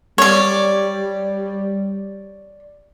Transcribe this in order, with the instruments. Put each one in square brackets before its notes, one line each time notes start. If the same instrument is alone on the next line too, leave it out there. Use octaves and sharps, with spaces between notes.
[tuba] G3 [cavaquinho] C#5 D5